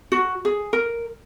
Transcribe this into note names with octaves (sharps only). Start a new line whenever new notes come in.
F#4
G#4
A#4